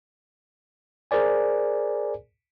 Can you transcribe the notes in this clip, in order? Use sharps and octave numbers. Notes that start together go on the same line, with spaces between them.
G#4 A#4 C5 D5 G#5